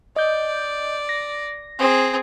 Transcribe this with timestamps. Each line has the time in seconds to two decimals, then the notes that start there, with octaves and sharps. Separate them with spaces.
0.16 D5 D#5 G6
1.09 A#6
1.79 C4 G#4